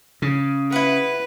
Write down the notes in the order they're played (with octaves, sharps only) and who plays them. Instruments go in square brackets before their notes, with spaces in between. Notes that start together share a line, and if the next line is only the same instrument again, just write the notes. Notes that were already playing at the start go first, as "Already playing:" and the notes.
[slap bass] C#3
[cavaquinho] E4 F#5 [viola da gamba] B4